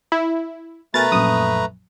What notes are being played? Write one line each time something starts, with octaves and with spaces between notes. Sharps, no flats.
E4
B2 A3 A#4 B4 G#5 A#5 A6
A#1 F#2 D#6